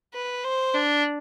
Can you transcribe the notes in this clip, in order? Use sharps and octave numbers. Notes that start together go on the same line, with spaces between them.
B4
C5
D4